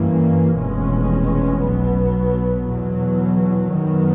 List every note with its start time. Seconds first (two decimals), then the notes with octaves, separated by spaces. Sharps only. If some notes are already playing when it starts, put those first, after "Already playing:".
Already playing: G2 E3 G3 A#3 C#4
0.55 F1 E2 B2 G#3 C#4
1.61 B1 B2 F#3 B3
2.67 E2 B2 F#3
3.72 F#2 D#3 F#3 B3